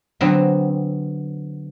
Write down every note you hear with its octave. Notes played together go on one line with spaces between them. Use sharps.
D3 F#3 B3 C4